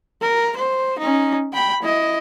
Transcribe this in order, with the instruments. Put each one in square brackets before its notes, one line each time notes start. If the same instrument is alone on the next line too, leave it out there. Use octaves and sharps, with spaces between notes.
[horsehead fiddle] A#4
C5
C#4 D#4
G5 B5
E4 D#5